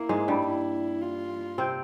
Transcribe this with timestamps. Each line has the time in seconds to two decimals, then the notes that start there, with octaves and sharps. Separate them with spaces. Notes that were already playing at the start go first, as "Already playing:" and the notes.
Already playing: A#3 E4
0.09 G#2 G#3
0.28 G2 G3
0.46 E4
1.02 F4
1.58 C3 C4